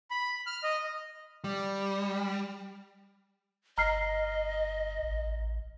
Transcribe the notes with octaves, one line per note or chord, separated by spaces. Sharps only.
B5
F6
D#5
G3
G1 D#5 A#5 F6 C7
A1